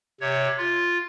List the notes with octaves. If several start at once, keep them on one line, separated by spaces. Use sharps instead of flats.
C3 C#5
F4